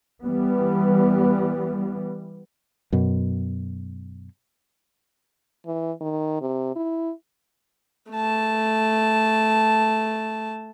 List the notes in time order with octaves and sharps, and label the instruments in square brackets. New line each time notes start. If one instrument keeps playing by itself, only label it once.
[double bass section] E3 G3 B3
[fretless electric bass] F#2 B2
[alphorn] E3
D#3
C3
E4
[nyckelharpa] A3 A5